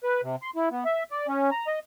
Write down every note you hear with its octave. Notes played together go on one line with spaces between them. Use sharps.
B4
C3
C6
E4
B3
E5
D5
C#4
A#5
D#5